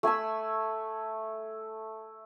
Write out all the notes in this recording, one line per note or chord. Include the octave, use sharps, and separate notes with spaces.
A3 G#5 B5 E6